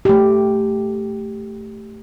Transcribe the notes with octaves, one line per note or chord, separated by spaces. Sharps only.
A3 G4